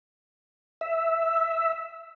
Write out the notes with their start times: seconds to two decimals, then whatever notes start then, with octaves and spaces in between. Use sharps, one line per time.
0.81 E5